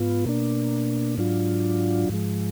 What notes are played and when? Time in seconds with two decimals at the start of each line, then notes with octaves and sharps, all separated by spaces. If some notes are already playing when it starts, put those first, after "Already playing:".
Already playing: G#2 B3 F4
0.26 B2 A#3 D4
1.18 G#2 F#3 D4 F4
2.09 G#2 F3 G#3